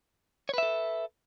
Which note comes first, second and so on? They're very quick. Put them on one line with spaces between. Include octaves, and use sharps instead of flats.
C#5 B4 E5 A4